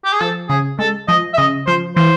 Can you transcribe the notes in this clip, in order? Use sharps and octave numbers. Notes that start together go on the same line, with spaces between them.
G4
G#4
F3 A4
C#3 G#4
G#3 A4
F3 D#5
E5
C#3 D#5
F3 C5
E3 C5